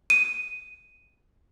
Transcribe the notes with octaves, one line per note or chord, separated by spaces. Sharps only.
D#7